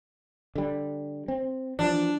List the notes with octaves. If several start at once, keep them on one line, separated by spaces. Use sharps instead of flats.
D3 G3
C4
E3 F3 G3 D4